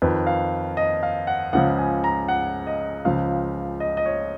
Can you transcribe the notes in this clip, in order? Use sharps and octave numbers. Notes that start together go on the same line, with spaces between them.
F2 D#3 B4
F5
D#5
F5
F#5
C#2 C#3 F3 F#5
G#5
A#5
F#5
D#5
C#2 C#3 F3 F5
D#5
D#5
C#5